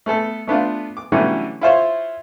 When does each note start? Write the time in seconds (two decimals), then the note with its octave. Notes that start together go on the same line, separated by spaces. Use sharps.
0.06 A3 B3 A4
0.47 A3 B3 D4 F4
0.97 D6
1.12 D3 E3 F#3 G3 A3 C#4
1.61 E4 F4 C5 C#5